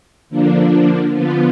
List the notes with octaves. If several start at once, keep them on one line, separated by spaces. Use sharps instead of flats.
D3 F3 A#3 D4
D3 F3 B3 F4